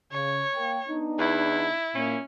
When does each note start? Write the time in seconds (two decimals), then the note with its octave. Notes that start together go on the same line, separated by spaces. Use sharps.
0.12 C#3 C#5
0.55 A#3 G5
0.89 B3 D4 D#4
1.19 E2 E4
1.95 A#2 C#4